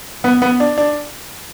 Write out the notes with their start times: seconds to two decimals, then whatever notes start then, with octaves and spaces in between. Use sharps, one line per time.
0.24 B3
0.42 B3
0.60 D4
0.78 D4